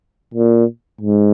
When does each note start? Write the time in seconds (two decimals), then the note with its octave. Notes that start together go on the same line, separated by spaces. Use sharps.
0.34 A#2
1.01 G#2